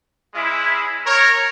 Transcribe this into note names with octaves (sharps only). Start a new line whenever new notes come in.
G#3 C#4 E4
A#4 C#5